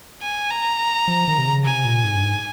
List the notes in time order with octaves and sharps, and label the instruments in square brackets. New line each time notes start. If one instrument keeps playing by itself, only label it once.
[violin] G#5
A#5
[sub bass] F3
D#3
C3
C#3
[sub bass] C3 [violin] G#5
[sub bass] A#2
G#2
G2
G#2